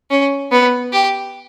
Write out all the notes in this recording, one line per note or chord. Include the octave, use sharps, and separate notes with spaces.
C#4
B3
G4